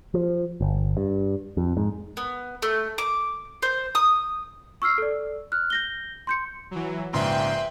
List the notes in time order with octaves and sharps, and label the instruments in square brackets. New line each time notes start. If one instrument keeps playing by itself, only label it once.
[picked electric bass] F3
G1
G2
F2
G#2
[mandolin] B3
A3
D6
C5
D#6
[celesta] C#6 E6 F6 C7
A4 D5
F6 F#6
G6 A#6 G7
C6 G6 C#7
[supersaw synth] E3 F#3
[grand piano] A#1 G#2 C#3 [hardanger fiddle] B4 E5 [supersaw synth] G5 C6